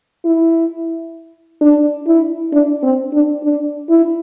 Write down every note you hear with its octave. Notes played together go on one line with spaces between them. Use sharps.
E4
D4
E4
D4
C4
D4
D4
E4